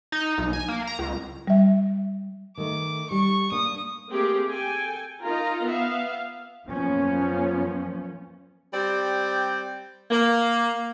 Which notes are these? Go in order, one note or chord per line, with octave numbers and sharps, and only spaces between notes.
D#4
B1
G#5
A#3
A#5
C#2
G3 E5
D#3 A3 D6
G3 C#6
A#3 D4 D#6
A3 A#3 C4 G4 G#4
A4 G5 G#5
D#4 F4 A#4 A#5
B3 E5 F5
F#2 F3 A#3 B3 C#4
G3 C4 G4 D5
A#3